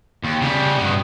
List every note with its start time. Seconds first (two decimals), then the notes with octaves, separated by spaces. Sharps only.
0.24 D#2
0.41 C#3 G3
0.78 G2 B2